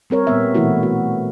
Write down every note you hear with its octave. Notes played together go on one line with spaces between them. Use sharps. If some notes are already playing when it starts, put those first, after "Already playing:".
G3 C4 A#4 C#5
A#2 G3 B3 E5
B2 E3 A3 E4 F#4
F#4